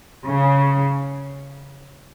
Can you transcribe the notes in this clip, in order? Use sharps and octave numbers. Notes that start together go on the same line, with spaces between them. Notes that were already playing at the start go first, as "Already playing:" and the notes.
C#3